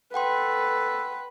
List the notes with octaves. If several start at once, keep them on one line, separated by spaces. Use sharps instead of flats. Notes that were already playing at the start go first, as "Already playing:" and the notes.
A4 B4 F#5 G5 C6